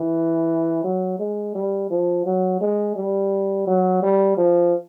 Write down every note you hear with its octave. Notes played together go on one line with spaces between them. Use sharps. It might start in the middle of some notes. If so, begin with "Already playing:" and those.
Already playing: E3
F#3
G#3
G3
F3
F#3
G#3
G3
F#3
G3
F3